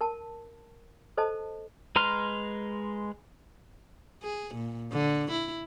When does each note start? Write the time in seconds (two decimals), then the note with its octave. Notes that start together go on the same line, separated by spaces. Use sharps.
0.01 A#4 A5
1.17 A4 C5 D#5 A5
1.96 G#3 B4 A#5 C6 F6
4.23 G#4
4.55 A#2
4.92 D3
5.32 E4